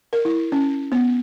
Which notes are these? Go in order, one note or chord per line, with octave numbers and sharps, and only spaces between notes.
A#4
E4
C#4
B3